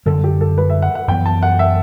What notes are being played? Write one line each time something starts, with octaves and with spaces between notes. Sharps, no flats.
F#2 D3 G3 A4
G4
A4
B4
E5
F#5
F#5
F#2 E3 B3 G5
A5
F#5
E5